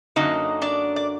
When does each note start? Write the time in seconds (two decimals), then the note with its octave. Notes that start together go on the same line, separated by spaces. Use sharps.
0.16 F#2 D3 F#3 A#3 D#4 D#5
0.62 D4 D5
0.96 D5